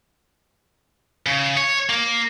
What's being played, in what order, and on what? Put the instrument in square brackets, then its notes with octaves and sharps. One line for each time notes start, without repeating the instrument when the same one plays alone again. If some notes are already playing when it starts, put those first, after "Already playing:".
[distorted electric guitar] C#3
C#5
A#3